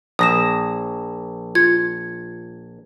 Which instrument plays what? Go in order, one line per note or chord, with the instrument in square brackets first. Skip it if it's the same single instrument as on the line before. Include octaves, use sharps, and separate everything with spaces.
[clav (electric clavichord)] A#1 [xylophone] D#6 A#6 E7
[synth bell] F4 [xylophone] G#6